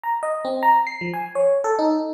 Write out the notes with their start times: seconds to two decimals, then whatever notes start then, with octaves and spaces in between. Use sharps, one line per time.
0.04 A#5
0.23 D#5
0.45 C4
0.63 A#5
0.87 C7
1.01 F3
1.14 G#5
1.35 C#5
1.64 A4
1.79 D#4